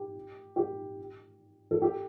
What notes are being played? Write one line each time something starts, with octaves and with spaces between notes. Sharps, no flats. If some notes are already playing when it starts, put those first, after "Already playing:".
Already playing: G4
G4
A4
G4